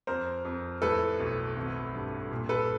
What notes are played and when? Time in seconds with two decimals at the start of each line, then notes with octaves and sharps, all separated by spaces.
0.07 F2 A#4 C5
0.45 F2
0.82 A2 A4 B4
1.20 B1
1.56 G#1
1.95 G2
2.31 A#2
2.49 A4 B4